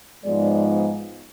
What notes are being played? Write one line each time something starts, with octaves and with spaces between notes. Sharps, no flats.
G#2 F3 G#3 B3 D5